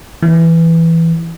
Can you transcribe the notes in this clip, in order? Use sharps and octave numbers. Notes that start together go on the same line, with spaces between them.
E3